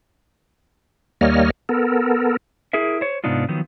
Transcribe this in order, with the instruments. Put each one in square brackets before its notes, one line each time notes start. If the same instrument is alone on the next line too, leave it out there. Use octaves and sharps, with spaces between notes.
[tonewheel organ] D#2 G3 A#3 C#5 D#5 F6
B3 A4 A#4
[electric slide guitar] E4 G#4 A#4 E5
C5 C#5
G#2 C3 B3 D4 D#4 F4
D#3 F3 F#3 B3